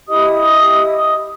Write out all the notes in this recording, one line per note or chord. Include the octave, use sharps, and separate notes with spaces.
E4 G4 D#5 D#6